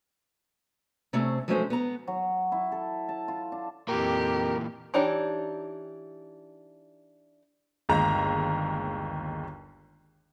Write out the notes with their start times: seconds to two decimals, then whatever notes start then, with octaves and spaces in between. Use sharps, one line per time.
1.13 C3 A3 C4 C#4
1.48 F3 F#3 G#3 A3 C#4 C5
1.70 B3 A#5
2.08 F#3
2.52 E4
2.72 A4
3.09 A5
3.28 F4
3.52 D4
3.88 F2 A#2 E3 G4 A#4
4.94 E3 D4 D#4 G4 C#5
7.89 G1 D#2 G#3 A#5